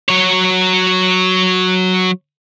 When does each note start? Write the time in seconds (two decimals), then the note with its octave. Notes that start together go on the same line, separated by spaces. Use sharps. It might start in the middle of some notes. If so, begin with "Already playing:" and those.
0.09 F#3 C#5